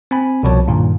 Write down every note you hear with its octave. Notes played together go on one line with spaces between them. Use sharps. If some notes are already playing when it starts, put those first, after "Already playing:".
C4 G#5 B5
C2 B2 F3 C#5 A5
G2 A#2 D#3